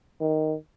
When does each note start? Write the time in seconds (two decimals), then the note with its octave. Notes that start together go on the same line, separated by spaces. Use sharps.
0.21 D#3